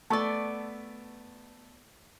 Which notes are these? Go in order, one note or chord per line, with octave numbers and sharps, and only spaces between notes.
A3 B3 D5 A5 C#6 E6